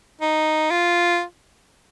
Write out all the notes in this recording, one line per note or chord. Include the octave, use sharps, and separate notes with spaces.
D#4
F4